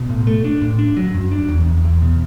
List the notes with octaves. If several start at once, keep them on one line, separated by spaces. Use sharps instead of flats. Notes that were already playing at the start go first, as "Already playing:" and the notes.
Already playing: B2
A2
A3
D4
A2
D4
F#3
F#2
D4
E2
E2
E2
B2